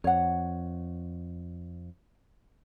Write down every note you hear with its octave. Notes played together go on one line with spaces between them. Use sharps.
F2 C#5 F#5